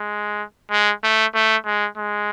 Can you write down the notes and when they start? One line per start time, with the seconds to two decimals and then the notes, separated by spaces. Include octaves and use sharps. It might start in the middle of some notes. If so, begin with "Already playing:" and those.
Already playing: G#3
0.71 G#3
1.04 A3
1.35 A3
1.66 G#3
1.98 G#3